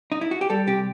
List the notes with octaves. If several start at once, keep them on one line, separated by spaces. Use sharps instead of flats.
D#4
E4
F#4
G4
G3 A4
C3 G4